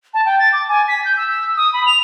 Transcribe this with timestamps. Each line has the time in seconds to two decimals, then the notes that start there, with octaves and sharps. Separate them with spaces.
0.14 A5
0.26 G5
0.39 A6
0.53 D6
0.69 G#5
0.88 B6
1.05 G6
1.17 E6
1.28 E6
1.57 D#6
1.73 B5
1.86 F7